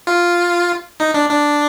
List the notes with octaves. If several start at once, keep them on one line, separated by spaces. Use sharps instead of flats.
F4
D#4
D4
D4